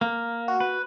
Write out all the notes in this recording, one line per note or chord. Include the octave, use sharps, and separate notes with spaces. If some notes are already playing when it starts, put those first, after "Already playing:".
A#3
F#4
B4